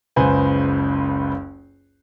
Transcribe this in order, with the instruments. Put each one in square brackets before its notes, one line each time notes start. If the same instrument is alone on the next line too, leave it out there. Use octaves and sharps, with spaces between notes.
[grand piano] F#1 C#2 B4 C5 G#5